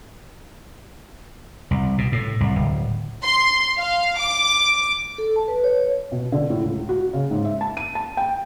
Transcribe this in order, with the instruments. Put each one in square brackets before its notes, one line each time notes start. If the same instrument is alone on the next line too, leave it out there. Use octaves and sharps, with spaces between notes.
[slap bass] C2
B2
A2
C2
D1
[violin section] C6
F5
D6
[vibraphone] A4
A5
B4
C#5
[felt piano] B2
D3
A2
C#2
F#4
C#3
G#2
E5
A5
D#7
A5
G5